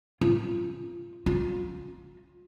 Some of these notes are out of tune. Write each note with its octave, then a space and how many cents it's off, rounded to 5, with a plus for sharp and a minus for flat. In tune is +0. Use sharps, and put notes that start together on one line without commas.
F4 -15
F4 +35